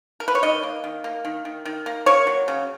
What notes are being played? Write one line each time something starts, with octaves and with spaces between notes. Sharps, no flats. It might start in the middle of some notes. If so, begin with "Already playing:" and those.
A#4
B4
C#5
D#3 D#5
A#3
D#3
A#3
D#3
D#3
D#3
A#3
A#3 C#5
F#3
C#3